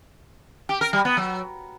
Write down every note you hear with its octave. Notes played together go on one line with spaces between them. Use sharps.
G4
A#4
G3
B3
F#3